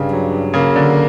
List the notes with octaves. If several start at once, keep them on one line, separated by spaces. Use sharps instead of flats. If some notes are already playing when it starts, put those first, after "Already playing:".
Already playing: G2 C#3
F#3
C#3 A#3
D3